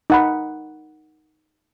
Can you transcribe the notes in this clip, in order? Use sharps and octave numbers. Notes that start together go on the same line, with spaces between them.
D#4 F#5 B5